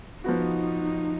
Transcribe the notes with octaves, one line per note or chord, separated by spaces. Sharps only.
F3 B3 D#4 F#4